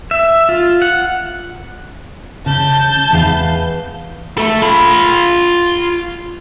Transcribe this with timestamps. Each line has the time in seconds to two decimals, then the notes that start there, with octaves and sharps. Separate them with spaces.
0.11 E5
0.49 F4
0.82 F#5
2.46 C#3 A5 G6
3.11 E2 B4 F5
4.38 A3 A4
4.62 F4 B5